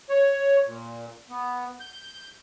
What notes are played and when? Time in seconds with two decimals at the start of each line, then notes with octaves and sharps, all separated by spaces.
0.10 C#5
0.66 A#2
1.30 B3
1.80 G6